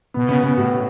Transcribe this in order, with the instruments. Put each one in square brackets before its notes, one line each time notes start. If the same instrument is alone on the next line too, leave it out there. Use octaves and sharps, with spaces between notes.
[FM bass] B2 [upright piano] B3
[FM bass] C#3 [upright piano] B3
[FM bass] C#3 [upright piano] B3
[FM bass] A2 [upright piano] F#4